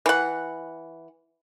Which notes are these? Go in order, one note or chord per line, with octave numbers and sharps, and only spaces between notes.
E3 F#5